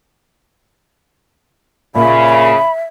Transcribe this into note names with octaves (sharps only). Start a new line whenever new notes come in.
A#2 C#3 A#3 E5 B5